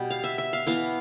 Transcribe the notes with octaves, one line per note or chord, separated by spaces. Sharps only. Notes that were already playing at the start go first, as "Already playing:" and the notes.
Already playing: B2 G3 B3 G4
F5
E5
E5
F5
E3 B3 F5